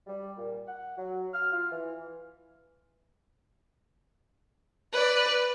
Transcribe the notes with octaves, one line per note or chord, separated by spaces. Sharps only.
G3
A#2
F#5
F#3
F6
F4
E3
B4 D5